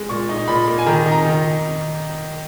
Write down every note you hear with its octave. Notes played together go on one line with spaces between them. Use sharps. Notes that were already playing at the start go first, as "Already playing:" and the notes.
Already playing: G#3
A#2 C#6
D#4
A#2 B5
A#3
G#5
D#3 A#5
D#4
A#5
D#3